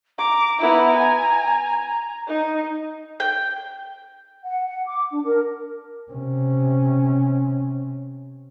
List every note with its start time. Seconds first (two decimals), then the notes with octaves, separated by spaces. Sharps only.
0.18 A#5 D6
0.59 B3 E4
0.97 G#5
2.28 D#4
3.20 G5
4.44 F#5
4.66 F#5
4.87 D6
5.11 D4
5.25 A#4
6.12 C3 C#4